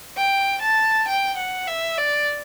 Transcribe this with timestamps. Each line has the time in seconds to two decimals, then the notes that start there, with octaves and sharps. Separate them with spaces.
0.17 G5
0.62 A5
1.08 G5
1.37 F#5
1.68 E5
1.98 D5